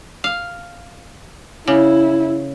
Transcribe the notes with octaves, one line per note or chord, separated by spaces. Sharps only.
F5
C#3 E4